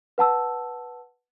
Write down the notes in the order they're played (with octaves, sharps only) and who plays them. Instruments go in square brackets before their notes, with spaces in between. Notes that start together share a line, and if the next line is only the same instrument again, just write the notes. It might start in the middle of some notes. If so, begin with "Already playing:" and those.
[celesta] B4 F#5 A5 E6